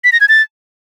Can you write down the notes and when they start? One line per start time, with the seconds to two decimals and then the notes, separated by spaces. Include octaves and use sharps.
0.04 B6
0.12 A#6
0.21 G#6
0.29 A6